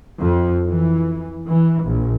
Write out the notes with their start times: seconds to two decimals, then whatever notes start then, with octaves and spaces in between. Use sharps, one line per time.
0.19 F2
0.67 E3
1.47 E3
1.84 A#1